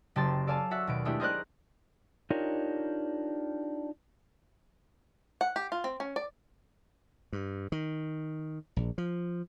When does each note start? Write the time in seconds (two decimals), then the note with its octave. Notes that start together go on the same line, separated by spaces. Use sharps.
0.16 F#1 G4 A5 C6 A6
0.47 A4 D5 F5 G#5 A5
0.71 F#4 A4 E5 F#5
0.87 D#2 B2 D7
1.05 G#3 A3 B3 D4 E4 G4
1.20 G#4 A#4 C5 D5 D#5 F#6
2.30 D4 D#4 F4 G4 A#4 C#5
5.41 F#5
5.56 G4
5.72 F4
5.84 C4
6.00 C#4
6.16 D5
7.33 G2
7.72 D#3
8.76 A#1
8.98 F3